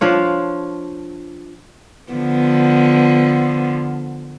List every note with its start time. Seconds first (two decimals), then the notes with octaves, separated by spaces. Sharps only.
0.01 F3 D4 F4 C#5
2.13 D3 F3 B3